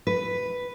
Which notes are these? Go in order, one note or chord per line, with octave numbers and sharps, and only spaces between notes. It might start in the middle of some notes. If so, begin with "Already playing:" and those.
B4